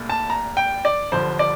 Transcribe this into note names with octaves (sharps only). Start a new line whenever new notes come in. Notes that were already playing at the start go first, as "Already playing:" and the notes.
Already playing: C2 A#2 A3
A5
A#5
G5
D5
G1 G2 D3 F3 C5
D5